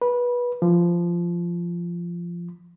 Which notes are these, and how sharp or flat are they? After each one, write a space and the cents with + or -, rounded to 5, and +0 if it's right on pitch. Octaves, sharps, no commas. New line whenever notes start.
B4 -20
F3 -15